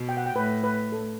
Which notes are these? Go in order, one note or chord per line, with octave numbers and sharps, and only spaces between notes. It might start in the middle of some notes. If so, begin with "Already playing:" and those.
Already playing: B2
G5
F#5
G5
A2 B4
B4
A4